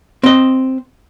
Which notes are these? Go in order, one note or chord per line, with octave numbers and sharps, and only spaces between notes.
C4 D#5